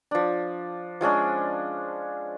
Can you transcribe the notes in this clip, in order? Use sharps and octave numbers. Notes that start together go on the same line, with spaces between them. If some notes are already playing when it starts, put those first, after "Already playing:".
F3 D4
F3 G#3 C#4 D4